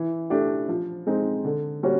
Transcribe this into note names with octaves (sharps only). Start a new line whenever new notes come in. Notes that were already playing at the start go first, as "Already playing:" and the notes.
Already playing: E3
A3 D4 G4
F3
G#3 C4 D#4
D3
G3 A#3 C#4 F#4